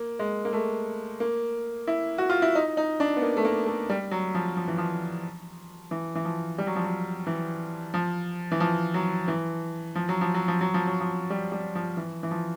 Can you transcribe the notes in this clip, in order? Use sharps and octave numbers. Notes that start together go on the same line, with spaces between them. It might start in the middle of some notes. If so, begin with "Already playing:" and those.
Already playing: A#3
G#3
A#3
A3
A#3
E4
F#4
F4
E4
D#4
D#4
D4
B3
A#3
A3
A#3
A3
G3
F#3
F3
F3
E3
F3
E3
E3
F3
G3
F#3
F3
F#3
E3
F3
E3
F3
F#3
E3
F3
F#3
F3
F#3
F3
F#3
F3
F#3
F3
G3
G3
F3
E3
E3
F3